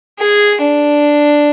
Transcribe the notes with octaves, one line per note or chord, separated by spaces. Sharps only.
G#4
D4